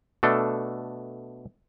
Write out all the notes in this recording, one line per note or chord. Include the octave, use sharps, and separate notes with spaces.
B2 A3 D4 A4